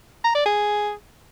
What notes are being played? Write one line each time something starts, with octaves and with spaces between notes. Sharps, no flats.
A#5
D5
G#4